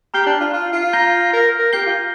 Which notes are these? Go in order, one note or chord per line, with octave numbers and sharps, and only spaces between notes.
G4 A#5 F6 C7 G7
D4
F4
F4
F4
A#5 G6 A#6 G7
A#4
A#4
G4 G6 C7 G7
F4